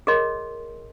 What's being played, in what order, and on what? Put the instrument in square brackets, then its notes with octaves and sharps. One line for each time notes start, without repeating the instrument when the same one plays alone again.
[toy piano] G#4 A#4 C#5 D#5 C6